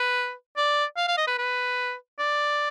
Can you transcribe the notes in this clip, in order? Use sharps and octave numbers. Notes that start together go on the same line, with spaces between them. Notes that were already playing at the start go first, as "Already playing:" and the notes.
Already playing: B4
D5
F5
F5
D#5
B4
B4
D5